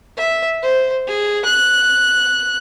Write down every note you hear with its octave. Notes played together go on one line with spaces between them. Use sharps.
E5
C5
G#4
F#6